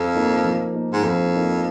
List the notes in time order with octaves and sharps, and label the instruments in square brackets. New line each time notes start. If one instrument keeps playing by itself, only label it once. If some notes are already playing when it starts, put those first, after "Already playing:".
Already playing: [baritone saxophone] F2 [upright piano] F3
[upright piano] A#3 D#4
F3
A#3 D#4
[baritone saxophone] G#2
[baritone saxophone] F2 [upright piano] F3
[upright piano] A#3 D#4